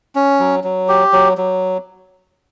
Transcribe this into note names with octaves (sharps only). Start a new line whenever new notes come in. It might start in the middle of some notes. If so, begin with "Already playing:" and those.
C#4
F#3
F#3
G4
F#3
F#3